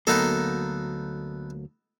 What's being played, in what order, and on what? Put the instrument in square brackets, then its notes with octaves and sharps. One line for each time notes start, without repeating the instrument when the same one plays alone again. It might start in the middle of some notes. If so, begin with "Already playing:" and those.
[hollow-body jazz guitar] D2 F#3 A#3 [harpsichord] B3 D#4 A4